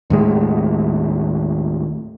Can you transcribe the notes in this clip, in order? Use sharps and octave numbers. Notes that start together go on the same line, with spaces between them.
D#2 A2 G#3